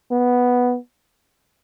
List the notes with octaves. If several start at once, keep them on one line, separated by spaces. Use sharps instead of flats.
B3